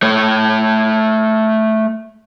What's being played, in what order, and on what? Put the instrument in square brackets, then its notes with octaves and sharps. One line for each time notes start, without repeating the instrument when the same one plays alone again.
[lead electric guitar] A3 C#5